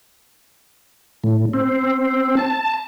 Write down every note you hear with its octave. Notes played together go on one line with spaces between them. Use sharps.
A2
C4
A5